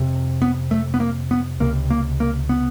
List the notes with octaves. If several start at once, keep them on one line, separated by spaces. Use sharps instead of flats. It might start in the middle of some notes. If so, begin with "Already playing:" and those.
Already playing: F2 C3
B3
A3
B3
A#3
B3
C#2 C3 A#3
A#3
A#3
B3